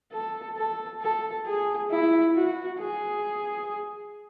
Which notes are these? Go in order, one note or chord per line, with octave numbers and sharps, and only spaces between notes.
A4
A4
A4
G#4
E4
F#4
G#4